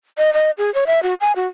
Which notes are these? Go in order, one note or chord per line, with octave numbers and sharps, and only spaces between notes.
D#5
D#5
G#4
C#5
E5
F#4
G#5
F#4